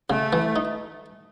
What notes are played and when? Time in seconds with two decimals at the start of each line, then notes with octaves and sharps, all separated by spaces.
0.10 C#3 A3
0.33 E3
0.56 D#4